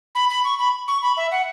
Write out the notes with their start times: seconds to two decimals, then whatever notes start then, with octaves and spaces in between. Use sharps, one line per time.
0.15 B5
0.30 B5
0.44 C#6
0.59 B5
0.88 C#6
1.02 B5
1.17 E5
1.32 F#5